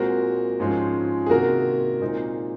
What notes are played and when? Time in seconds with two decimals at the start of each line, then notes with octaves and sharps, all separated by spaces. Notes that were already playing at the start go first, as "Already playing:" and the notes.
Already playing: A#2 G#3 C4 F#4 A#4
0.60 G#2 F3 G#3 C#4
1.26 G#4
1.30 C3 D#3 A#3 F#4 A#4
2.01 A#2 G#3 C4 D#4